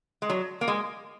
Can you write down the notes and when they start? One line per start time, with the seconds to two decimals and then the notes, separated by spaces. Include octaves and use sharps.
0.22 G#3
0.30 F#3
0.61 A#3
0.68 G#3